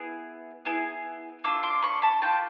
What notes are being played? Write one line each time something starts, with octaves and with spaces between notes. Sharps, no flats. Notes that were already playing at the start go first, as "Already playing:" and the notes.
Already playing: B3 E4 G#4
B3 E4 G#4
A#3 D4 F4 D6 E6
C6 D6
B5 C#6
A5 B5
A#3 D4 F4 G5 A5